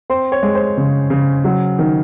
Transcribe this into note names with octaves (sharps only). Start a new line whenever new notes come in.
C4 C6
C#5
G#3
C5
C#3
C#3
F#3
D#3